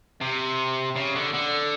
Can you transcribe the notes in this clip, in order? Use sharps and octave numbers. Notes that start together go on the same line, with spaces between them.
C3
C#3
D3
D3